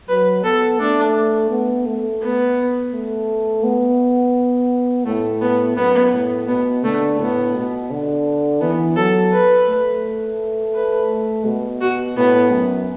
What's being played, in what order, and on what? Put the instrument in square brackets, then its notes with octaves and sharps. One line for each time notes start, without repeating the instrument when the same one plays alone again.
[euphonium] F#3 [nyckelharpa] B4
[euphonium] B3 [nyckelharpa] A4
[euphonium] A3 [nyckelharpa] D4
[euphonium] B3
A3
[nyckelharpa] B3
[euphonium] A3
B3
[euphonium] A2 [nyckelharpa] A3
[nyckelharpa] B3
[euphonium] F#2 [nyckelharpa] B3
[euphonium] A2
[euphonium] B2 [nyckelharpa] B3
[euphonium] D3 [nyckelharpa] A3
[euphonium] A2 [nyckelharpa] B3
[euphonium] B2
D3
[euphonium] E3 [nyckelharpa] B3
[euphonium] F#3 [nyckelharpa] A4
[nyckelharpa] B4
[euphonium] A3
[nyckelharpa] B4
[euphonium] B2
[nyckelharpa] F#4
[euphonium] A2 [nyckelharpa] B3
[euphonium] F#2